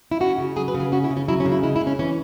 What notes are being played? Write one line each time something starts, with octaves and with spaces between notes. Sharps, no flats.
E4
C#4 F#4
C#3
F#3 G#4
B4
C#3
G#4
C#4 F#4
E4
C#3
C#4
F#3 E4
C#4
C#3
E4
G#3 E4
E4
C#3
C#4
E3 C#4